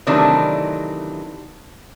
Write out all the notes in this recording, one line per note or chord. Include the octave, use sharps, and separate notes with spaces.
C3 D#3 E3 F#3 A3 D4